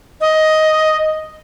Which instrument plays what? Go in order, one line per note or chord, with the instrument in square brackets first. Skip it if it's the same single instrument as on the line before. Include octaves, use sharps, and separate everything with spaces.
[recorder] D#5